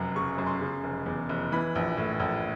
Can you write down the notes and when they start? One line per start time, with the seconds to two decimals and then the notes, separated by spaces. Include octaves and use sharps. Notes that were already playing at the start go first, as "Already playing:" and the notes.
Already playing: F1 F#2 F#3
0.15 C#3 C#6
0.31 C#6
0.38 F#2
0.46 C6
0.61 C#3
0.84 F1
1.06 E2
1.29 F1
1.52 E3 B5
1.75 A#1
1.97 A2
2.20 A#1